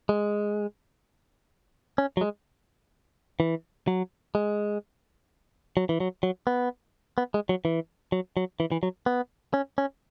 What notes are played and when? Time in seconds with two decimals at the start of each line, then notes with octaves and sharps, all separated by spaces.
0.09 G#3
1.98 C#4
2.17 F#3
2.21 G#3
3.40 E3
3.88 F#3
4.35 G#3
5.77 F#3
5.89 E3
6.00 F#3
6.23 F#3
6.47 B3
7.18 B3
7.34 G#3
7.49 F#3
7.65 E3
8.12 F#3
8.37 F#3
8.60 E3
8.72 E3
8.83 F#3
9.06 B3
9.54 C#4
9.78 C#4